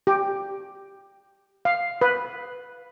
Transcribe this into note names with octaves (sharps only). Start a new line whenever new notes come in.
G4
F5
B4